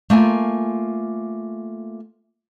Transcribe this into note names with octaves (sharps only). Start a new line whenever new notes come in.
A3 A#3 F4 G#5